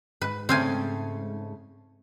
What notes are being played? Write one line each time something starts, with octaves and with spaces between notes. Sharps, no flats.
G#2 B4
C#3 A3 C4 F5 G#5